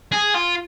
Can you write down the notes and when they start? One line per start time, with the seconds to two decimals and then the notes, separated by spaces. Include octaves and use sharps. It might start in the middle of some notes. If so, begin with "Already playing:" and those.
0.12 G#4
0.34 F4